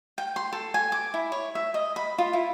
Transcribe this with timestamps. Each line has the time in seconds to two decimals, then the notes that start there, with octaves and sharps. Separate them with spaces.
0.18 G5
0.36 C6
0.53 A4
0.74 G#5
0.92 D6
1.14 E4
1.32 C#5
1.55 E5
1.74 D#5
1.96 B5
2.18 F4
2.33 E4